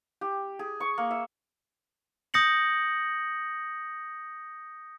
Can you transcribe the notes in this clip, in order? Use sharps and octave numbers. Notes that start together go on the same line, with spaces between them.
G4
G#4
C#6
A#3
E5
D#6 G6 A#6 C#7 F#7